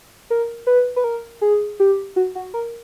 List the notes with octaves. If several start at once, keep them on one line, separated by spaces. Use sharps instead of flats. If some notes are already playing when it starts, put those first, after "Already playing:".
A#4
B4
B4
A#4
G#4
G4
F#4
F#4
A#4